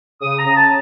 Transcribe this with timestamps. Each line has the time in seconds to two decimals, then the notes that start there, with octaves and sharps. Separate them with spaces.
0.20 C#3 D#6
0.39 A#5
0.45 C#4
0.56 A5